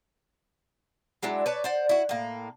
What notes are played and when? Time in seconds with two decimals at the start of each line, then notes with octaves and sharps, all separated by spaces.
1.23 F#3 G#3 D4 E4
1.46 B4 C#5 D5 A5
1.64 C5 D5 F#5
1.89 E4 F#4
2.09 A2 A#3